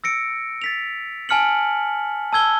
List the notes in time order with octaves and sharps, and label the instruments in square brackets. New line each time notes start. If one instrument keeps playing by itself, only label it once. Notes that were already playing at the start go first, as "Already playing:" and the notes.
[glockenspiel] E6 A#6 C#7 D7
A6 B6 F7
G#5 A5 F6 C#7 F#7
A5 E6 G#6 G7